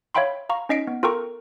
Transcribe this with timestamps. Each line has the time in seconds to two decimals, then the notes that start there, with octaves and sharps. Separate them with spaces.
0.15 C#5 E5 F5 G5 B5 C6
0.49 F5 A#5 C#6
0.69 C#4 D#4 D#5 B6 C7 D7
0.87 B3
1.03 F4 A4 A#4 G5 A#5 C#6